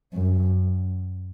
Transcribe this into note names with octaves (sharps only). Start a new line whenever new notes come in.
F#2